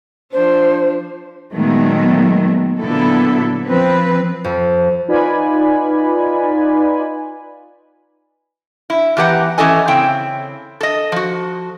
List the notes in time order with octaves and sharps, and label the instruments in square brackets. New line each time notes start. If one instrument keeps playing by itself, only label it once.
[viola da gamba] F3 D4 [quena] C5
[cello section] A#2 D#3 F#3 G#3 A3 B3
A#2 D3 F#3 B3 E4 A4
F3 C4 B4
[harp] F2
[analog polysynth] D#4 F4 B4 D5 G#5 B5
[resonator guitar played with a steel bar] E4
E2 E3 G4 B4 F#5 A#5
E3 C#4 E4 A4 D#5 G#5
C#3 C4 E4 G5
A4 D#5
F3 F#4